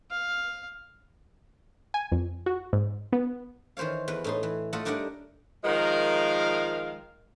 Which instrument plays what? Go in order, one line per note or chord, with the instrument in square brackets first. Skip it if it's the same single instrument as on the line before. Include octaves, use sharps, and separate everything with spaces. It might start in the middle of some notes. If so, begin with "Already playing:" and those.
[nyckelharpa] F5
[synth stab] G#5
F2
F#4
G#2
B3
[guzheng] D#3 E3 C5 C#5 F5
E2 B4
A2 D#4 C6
E3
A3 F4 A4 D#5 F#5
G3 D4 D#4 A#4 D5 F#5
[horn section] D#3 F3 G#3 A#4 F5